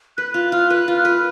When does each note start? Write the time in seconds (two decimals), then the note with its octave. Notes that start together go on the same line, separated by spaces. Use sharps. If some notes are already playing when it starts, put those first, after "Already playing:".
0.17 B4 F#6
0.34 F4 F#6
0.52 F4 F6
0.70 B4 F#6
0.88 F4
0.97 F6
1.05 B4